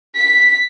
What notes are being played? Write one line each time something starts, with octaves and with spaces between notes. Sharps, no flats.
B6